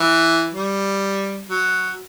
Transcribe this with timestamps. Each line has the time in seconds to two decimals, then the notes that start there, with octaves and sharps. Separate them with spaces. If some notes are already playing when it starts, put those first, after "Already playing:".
Already playing: E3
0.54 G3
1.49 F#3